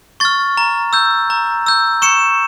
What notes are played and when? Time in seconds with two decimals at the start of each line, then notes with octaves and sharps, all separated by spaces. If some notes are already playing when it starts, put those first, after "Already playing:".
0.20 C#6 F6 A6
0.57 A#5
0.93 E6 G6
1.30 A#5
1.66 E6 G6
2.02 C#6 C#7 E7